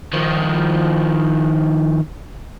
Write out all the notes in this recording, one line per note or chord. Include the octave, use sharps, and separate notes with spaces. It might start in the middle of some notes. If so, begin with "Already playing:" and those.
D#3 F3